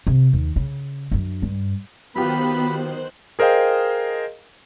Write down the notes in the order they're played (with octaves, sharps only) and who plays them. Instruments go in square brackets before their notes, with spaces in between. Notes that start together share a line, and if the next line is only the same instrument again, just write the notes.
[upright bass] C3
D#2
C#3
F#2 D4
G2
[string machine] D#3 C5 F#6 [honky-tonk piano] F#3 F4 G4 [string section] B3 [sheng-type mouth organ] B5
[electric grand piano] G#4 A#4 C5 D#5 F5 G5